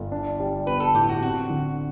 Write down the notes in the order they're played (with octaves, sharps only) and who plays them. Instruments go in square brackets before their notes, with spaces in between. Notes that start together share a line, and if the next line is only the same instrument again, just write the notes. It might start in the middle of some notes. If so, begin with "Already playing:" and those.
Already playing: [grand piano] G1
D4
G3
[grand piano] B3 [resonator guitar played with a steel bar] B4
[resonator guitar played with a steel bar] A4
[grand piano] A2 [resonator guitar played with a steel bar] G4
[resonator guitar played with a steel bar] F#4
[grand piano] C4 [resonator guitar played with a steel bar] F#4
[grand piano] D3